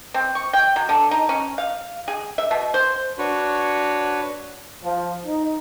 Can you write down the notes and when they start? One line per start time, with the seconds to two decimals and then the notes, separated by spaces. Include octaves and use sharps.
0.14 C4
0.35 C#6
0.53 G5
0.76 F#3
0.89 D3
1.11 D#4
1.29 C#4
1.58 F5
2.08 G#4
2.38 E5
2.51 B2
2.74 C5
3.18 D4 F#4 B4 C#5
4.84 F3
5.26 D#4